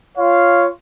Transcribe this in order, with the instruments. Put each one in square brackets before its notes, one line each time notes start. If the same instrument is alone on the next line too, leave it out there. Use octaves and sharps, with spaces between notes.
[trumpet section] F4 C#5 F5